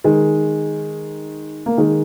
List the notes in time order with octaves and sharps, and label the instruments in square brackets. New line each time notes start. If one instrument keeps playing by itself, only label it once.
[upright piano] D#3 G#3
A#3
D#3 G#3